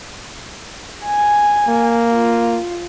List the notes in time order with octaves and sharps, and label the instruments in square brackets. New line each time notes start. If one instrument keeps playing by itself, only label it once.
[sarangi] G#5
[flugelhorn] A#3
[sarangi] F4